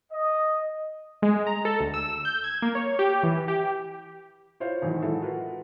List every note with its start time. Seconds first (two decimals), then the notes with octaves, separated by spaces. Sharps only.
0.12 D#5
1.22 G#3
1.47 A#5
1.65 A4
1.80 D2
1.94 E6
2.25 G6
2.44 G#6
2.62 A#3
2.75 C#5
2.99 G4
3.23 E3
3.48 G4
4.60 E4 F4 C5 C#5 F5
4.82 G#1 E2 A2 D#3 E3 F#3
5.02 E3 F#3 G#3 E4 A4
5.22 F4 F#4 A#4 B4